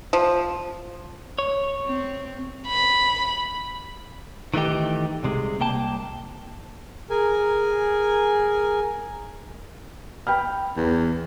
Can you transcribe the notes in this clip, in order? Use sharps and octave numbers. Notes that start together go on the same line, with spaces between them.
F3
C#5
C4
B5
D#3 E3 A3 D#4 G4
C2 C3 G#3
C2 A#3 G5 A5
G#4 A#4 G#5
G5 B5 F6
E2